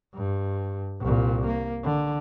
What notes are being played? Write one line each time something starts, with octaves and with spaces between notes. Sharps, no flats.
G2
C2 A#2
A#3
D3